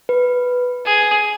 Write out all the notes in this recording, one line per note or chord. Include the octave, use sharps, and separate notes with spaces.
B4
G#4